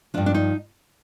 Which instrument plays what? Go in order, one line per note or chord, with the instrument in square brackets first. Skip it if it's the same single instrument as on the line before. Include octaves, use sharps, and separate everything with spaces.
[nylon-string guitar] F3 D4
G2
D4
D#4